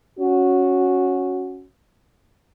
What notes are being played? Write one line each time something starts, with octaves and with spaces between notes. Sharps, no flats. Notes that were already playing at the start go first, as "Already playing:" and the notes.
C#4 F#4